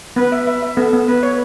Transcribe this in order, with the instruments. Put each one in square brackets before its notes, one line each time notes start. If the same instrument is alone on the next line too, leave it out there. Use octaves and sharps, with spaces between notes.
[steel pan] B3 [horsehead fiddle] B4
[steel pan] E5
E5
E5
[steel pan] B3 [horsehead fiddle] A4
[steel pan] B3
[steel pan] B3 [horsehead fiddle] B4
[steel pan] C#5